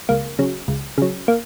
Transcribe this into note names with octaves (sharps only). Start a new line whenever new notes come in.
C#2 A#3
C#3 F#3
C#2
C#3 F#3
A#3